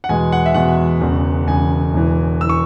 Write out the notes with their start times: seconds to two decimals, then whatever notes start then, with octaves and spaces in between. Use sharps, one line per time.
0.04 F#5
0.09 E2 B2 G#3 G#5
0.32 F#5
0.46 E5
0.54 E2 B2 G#3 F#5
1.01 E1 E2 C#3
1.48 E1 E2 C#3 G#5
1.94 E1 E2 E3
2.41 E3 E6
2.49 C#6